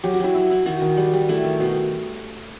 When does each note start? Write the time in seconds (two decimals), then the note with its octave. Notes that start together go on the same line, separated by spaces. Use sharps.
0.04 F#3 G4
0.14 F#4
0.20 F#3 E4
0.35 E4
0.51 E4
0.66 D#3 F#4
0.82 D#3
0.97 G3
1.13 G3
1.29 A3 E4
1.44 D#3
1.60 B2